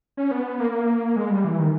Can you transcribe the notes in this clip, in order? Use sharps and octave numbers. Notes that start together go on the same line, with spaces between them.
C#4
B3
A#3
G#3
G3
E3
D#3